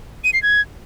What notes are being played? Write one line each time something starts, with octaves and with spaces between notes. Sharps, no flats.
D#7
C7
G#6